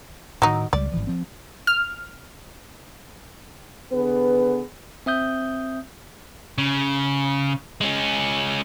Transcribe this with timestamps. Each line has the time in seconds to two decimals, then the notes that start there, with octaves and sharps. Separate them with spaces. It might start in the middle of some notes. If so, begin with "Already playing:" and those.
0.42 A2 D#3 F#3 D#4
0.73 C#2 F3 G3 D5
0.92 G#1 E3 F3
1.07 F3 C4
1.67 F6
3.92 D3 B3 G#4 B4
5.06 C4 E5 D#6 G6
6.58 C#3
7.81 G#3 C#4